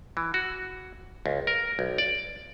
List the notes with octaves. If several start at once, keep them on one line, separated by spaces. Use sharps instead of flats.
E3
F#4
C#2
A#4
B1
D5